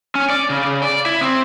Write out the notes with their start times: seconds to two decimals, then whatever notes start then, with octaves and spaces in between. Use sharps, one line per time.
0.15 C#4
0.30 D5
0.50 C#3
0.82 D5
1.06 E4
1.21 C4